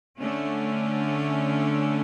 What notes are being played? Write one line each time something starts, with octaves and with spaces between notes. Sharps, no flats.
D3 A3 C#4